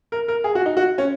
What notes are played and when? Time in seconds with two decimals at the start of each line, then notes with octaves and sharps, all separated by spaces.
0.12 A#4
0.28 A#4
0.44 G#4
0.55 F#4
0.66 D#4
0.77 F#4
0.98 C#4